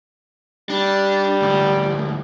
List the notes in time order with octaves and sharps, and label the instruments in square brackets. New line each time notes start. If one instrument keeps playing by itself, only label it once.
[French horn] G3 [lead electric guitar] D4
[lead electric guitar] D2 G#2